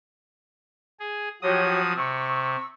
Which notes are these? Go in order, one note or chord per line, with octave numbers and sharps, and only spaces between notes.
G#4
F3 F#3 F#4 G4 C#5 D#6
C3 C#6 E6